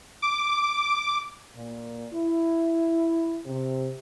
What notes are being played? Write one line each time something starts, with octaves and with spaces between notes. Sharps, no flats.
D6
A#2
E4
C3